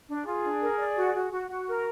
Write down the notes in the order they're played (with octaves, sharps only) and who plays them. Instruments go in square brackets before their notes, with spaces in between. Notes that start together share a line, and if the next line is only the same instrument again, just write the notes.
[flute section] D4
[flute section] F4 [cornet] G#4
[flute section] D4
A#4
D5
F#4
F#4
F#4
F#4
A#4